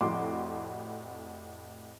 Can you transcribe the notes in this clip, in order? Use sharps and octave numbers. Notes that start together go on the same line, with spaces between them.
F1 F2 A2 F#4 C6 D6